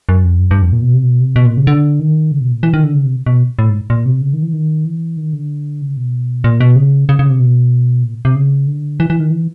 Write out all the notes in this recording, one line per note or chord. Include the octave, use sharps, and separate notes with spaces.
F#2
F2
F#2
G2
F2
A#2
B2
C3
B2
C3
B2
A#2
C#3
D3
D#3
C#3
B2
A#2
E3
D#3
D3
C#3
C3
B2
A2
G#2
A#2
C3
C#3
D#3
E3
D#3
E3
D#3
D3
C#3
B2
A#2
B2
C#3
C#3
C#3
C3
B2
A#2
C3
C#3
D3
E3
E3
D#3
E3